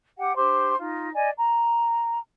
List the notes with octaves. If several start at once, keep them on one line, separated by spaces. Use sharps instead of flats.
G4 F#5 G5
D4 G4 C5 C6
D#4 F4
D5 D#5 G#5
A#5